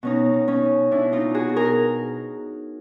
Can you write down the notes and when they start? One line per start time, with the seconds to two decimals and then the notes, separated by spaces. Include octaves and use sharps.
0.03 B2 C#4 D#4
0.33 B2
0.48 C#4 D#4
0.62 B2
0.91 B2 D4 E4
1.13 D#4 F4
1.20 B2
1.34 F#4 G#4
1.49 B2
1.56 G#4 A#4